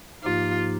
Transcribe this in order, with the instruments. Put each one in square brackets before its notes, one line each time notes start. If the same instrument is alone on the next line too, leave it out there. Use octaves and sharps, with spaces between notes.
[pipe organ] G#2 F3 A#3 D#4 G4 [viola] F4